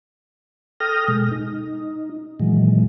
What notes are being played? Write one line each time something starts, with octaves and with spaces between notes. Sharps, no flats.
A4 G5 D#6 F6 A#6
B2 G#3
D#4
A#2 D#3 E3 F#3 G#3